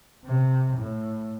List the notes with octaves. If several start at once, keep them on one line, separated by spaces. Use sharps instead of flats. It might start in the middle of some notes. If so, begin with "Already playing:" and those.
C3
A2